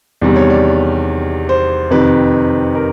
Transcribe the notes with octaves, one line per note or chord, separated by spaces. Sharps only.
E2 C3 D#3 G3
C#5
D5
C5
F2 C3 D#3 B4
A#4